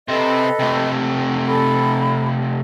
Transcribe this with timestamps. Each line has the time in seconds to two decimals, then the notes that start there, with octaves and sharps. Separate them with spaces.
0.08 C3 A4 B4 C5 D#5
0.60 C3 A3
1.47 A4 B5